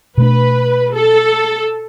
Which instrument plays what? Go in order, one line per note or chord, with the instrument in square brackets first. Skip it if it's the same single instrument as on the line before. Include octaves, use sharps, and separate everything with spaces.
[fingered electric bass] B2 A3 D4 [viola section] B4
[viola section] A4